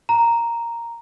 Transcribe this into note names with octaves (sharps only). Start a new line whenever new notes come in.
A#5